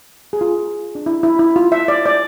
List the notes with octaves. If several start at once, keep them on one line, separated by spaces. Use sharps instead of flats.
G#4
F4
D4
E4
E4
E4
F4
E5
D5
D5